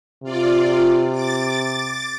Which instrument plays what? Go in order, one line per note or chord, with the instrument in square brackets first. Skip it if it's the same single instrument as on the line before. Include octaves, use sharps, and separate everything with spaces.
[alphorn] C3 [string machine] F4 D5
[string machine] D6 A6